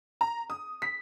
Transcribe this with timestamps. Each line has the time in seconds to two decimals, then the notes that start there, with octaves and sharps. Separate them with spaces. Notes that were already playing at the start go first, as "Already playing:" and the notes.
0.21 A#5
0.50 D#6
0.82 B6